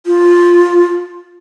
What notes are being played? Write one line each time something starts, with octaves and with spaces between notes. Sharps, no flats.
F4